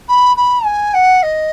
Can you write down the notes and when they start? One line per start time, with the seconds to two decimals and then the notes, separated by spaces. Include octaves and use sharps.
0.08 B5
0.36 B5
0.65 G#5
0.94 F#5
1.23 D#5